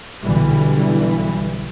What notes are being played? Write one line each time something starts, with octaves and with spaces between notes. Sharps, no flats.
B1 D3 E3 G3